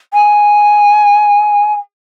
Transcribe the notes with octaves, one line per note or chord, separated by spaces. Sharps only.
G#5